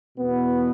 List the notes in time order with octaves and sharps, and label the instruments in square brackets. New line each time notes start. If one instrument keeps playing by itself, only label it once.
[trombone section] E2 B2 B3